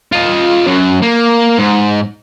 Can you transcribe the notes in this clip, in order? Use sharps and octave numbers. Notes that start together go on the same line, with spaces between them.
F4 D#5
F#2 F#3
A#3
G#2